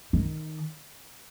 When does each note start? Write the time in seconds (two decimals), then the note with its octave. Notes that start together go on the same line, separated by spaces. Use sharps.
0.13 D#3